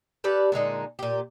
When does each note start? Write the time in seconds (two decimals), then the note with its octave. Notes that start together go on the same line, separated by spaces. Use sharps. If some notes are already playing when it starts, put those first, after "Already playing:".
0.24 G4 A4 B4 D5
0.52 A#2 D3 G#3 D#4
0.99 A#2 G4